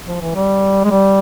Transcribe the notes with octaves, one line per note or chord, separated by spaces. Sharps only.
F3
E3
G3
G#3
G3